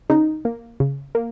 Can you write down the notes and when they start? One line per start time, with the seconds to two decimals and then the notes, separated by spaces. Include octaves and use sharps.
0.10 C#3 D#4
0.45 A#3
0.80 C#3
1.15 A#3